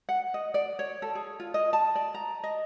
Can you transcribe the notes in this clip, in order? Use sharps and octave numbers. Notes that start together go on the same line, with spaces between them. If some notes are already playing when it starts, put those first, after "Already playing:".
F#5
D#5
D5
C#5
A4
G#4
F4
D#5
A5
D5
A#5
D#5